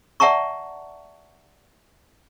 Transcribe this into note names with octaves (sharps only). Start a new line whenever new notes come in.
D5 E5 F#5 A5 A#5 C#6